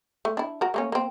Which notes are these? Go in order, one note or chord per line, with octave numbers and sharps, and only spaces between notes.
A3
D4 E4
F#4 A#4
A3 A#3 C#4
A#3 C4